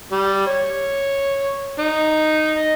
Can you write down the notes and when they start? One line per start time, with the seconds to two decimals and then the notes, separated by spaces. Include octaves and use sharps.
0.12 G3
0.46 C#5
1.79 D#4
2.56 D#5